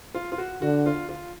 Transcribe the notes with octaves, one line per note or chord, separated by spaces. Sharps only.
F4
F4
F#4
D3 F#4
F4
F4